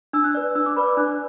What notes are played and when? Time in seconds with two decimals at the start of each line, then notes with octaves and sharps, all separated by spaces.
0.13 D4 E6
0.24 F#6
0.34 B4 D5
0.55 D4 E6
0.66 D6
0.76 B4 D5 B5
0.87 D6
0.97 D4 F#6